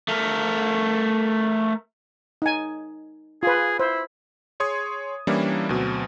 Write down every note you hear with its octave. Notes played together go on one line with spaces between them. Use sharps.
A3 A#4
D#4 G#5
F4 G#4 B4
E4 C5
G#4 C#5 C6 D#6 G#6
E3 G3 A#3 C#4 D4 E4
D2 B2 F#3 C4